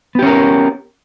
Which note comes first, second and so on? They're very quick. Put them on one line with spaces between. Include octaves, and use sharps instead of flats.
B3 G4 C#4 A#4